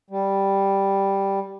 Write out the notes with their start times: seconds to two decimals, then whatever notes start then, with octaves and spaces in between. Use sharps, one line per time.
0.10 G3